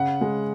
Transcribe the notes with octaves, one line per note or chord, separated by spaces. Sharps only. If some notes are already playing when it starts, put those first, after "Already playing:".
Already playing: C#3 F#5
G#3